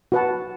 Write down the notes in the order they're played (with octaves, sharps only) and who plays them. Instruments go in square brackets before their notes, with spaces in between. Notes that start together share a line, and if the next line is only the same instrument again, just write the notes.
[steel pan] F#4 B4 F#5 A5